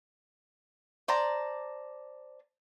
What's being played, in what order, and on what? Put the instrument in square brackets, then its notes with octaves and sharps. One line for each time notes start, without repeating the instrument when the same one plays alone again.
[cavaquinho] C5 D5 A5 A#5